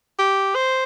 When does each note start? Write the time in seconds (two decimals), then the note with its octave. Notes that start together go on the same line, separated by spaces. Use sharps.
0.19 G4
0.55 C5